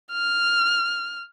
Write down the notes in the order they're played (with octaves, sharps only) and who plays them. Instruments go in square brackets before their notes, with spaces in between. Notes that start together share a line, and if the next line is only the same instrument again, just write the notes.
[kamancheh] F6